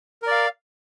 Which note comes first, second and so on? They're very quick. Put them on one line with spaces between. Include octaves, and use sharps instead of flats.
A#4 D5 F5